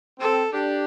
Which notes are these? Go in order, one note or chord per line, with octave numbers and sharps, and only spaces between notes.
C4 A4
D4 G4